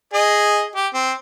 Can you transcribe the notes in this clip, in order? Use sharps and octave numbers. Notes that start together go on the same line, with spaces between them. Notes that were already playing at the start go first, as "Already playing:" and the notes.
G#4 D#5
G4
C4